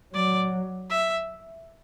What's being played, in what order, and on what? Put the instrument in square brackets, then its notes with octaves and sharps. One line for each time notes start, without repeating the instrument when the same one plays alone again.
[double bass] F#3 [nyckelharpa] D5
[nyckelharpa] E5